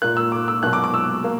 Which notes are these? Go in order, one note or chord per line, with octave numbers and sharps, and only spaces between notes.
A#2 A#3 F#6
E6
D6
E6
B2 F#3 A#3 F#6
D6
D6
E6
A#3